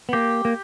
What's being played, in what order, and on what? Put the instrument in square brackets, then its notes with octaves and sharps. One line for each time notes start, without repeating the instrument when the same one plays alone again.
[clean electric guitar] B3
[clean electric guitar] A#3 [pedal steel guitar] G4
[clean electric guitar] A#3